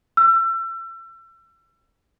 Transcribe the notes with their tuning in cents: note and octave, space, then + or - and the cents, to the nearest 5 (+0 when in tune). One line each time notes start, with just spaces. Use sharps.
E6 +35